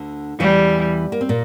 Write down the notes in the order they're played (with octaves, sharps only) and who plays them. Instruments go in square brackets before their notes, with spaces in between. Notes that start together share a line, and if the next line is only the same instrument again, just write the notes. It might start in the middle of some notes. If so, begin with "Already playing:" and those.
Already playing: [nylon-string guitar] D2 D3
[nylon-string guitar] E2 E3 [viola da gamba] G3
[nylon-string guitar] A#3
C4
A#2 A#3